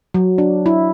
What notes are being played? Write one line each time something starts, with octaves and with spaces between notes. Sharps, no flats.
F#3
D4
E4